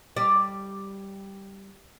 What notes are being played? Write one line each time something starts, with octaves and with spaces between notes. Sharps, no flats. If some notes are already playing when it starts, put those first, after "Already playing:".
G3 D5